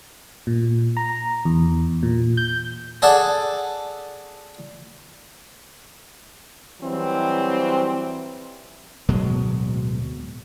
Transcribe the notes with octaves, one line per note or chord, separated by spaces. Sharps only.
A#2
A#5
E2
A#2
G6
G#4 A4 D5 F#5 A5
E3 F#3 G3 C4
D1 B2 F#3 G#3